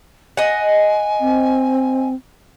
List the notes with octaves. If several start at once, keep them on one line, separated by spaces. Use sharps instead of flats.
D#5 F#5 G#5
C4